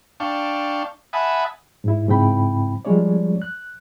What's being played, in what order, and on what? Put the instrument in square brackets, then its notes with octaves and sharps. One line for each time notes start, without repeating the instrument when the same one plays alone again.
[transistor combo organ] D4 F5 G5 A5 C#6
E5 F#5 G#5 A5 B5 D#6
[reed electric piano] G#2 E4
G#2 C#3 C4 E4 G5 B5
F3 G3 G#3 C#4 C#5 D5
F#6